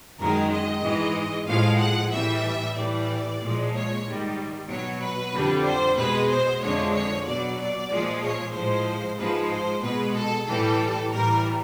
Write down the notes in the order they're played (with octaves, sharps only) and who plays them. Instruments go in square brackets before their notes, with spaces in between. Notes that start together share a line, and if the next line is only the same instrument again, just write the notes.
[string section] F#2 D#3 G#3 A#4
D#5
G#2 E3 G#3
A2 F3 G#3 F5
F#5
A2 E3 G3 E5
A2 E3 G3 D5
A#2 F3 G#3
C#5
G#2 D#3 G3
B2 F#3 C#5
B4
F2 D3 G3
C5
B2 G#3 B4
C5
F2 D3 F3 G#3 C#5
C#5
B2 F#3 D5
D5
A#2 F3 G#3
C#5
A2 F3 G#3 C5
G#2 F3 G#3 B4
C5
B2 G#3 B4
A4
A2 E3 G3 A4
A2 E3 G3 A#4